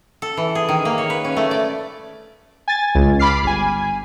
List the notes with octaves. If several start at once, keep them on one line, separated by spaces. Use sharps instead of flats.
A4
E3
G#4
D#3
A#3
C#5
B4
C#4
A3
D5
G#5 A6
C#2
B5 D6 F6 C7
G1 G#5